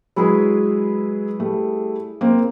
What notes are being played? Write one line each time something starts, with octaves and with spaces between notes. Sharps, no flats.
F#3 G#3 E4 G#4 B4
G3 A3
A#3 C4